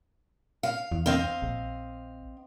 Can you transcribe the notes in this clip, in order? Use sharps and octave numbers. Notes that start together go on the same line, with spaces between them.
F5
E2
C4 D#5 F5
A#1